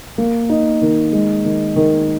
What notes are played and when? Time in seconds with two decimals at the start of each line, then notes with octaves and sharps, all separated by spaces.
0.18 A#3
0.49 D#4
0.81 D#3
1.12 G#3
1.45 D#3
1.76 D#3